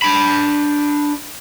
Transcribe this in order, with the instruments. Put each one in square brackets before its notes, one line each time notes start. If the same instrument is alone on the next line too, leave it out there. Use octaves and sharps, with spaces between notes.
[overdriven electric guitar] D4 B5